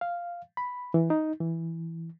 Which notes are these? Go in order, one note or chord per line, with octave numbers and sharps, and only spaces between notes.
F5
B5
E3
D#4
E3